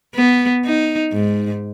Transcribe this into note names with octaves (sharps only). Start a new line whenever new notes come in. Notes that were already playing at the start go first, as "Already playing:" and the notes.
B3
D#4
G#2